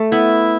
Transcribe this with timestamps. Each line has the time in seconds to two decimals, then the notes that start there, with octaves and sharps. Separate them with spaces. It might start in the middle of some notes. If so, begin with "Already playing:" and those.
Already playing: A3
0.12 B3 E4